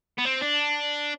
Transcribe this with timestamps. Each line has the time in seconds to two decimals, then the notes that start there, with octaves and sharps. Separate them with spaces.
0.18 B3
0.25 C4
0.41 D4